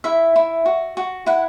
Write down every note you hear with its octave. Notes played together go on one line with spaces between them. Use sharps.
E4 E5
E4
F#4
F#4
E4 F#5